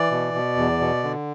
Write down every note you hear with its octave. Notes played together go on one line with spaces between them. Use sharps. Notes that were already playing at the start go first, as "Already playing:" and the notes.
Already playing: E3 D5
B2
B2
E2
B2
D3